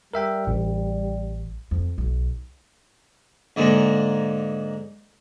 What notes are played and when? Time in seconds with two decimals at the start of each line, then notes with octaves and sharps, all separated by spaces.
0.14 G3 A#4 E5 G5
0.47 A1
1.71 F2
1.98 B1
3.56 G#2 D3 G#3 A#3